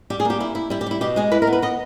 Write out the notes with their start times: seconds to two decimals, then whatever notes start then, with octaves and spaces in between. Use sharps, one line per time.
0.10 G3 G4
0.20 G#4
0.25 A#3 G4
0.40 E4
0.55 E4
0.70 G3 E4
0.81 G4
0.86 G3 E4
1.01 B2 G4
1.16 G#3 G#4
1.32 E4 B4
1.42 A#4
1.47 B3
1.53 B4
1.62 B3 D#5